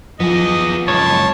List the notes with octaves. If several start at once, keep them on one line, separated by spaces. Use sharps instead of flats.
F3 B3 G#4 D#5
C#2 F#2 C#5 A5